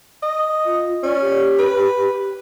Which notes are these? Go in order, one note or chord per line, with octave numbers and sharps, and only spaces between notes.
D#5
F4
C#4 D5
G4
B4